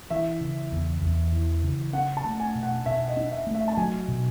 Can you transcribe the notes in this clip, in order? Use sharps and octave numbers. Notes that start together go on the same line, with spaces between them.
E3 E5
C#3
E2
E2
E3
C#3
C#4 F#5
A5
A3
G#5
B2
F#5
B2 E5
D#5
C#4
E5
A3
E5
A5
F#3 G#5
B2